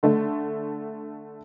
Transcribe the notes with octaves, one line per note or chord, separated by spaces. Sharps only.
D3 A3